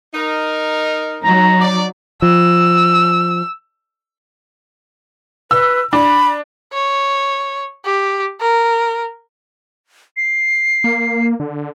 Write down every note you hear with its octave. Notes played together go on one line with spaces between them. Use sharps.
D#4 A#4
F#3 D#4 A#5
D5
F3 E6
B4 E6
D4 B5
C#5
G4
A#4
C7
A#3
D3